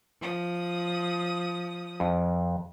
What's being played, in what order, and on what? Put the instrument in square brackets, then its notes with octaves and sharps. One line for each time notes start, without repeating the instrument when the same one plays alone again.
[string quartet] F3 D#6
[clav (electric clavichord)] F2